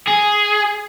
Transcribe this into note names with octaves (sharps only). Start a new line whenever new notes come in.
G#4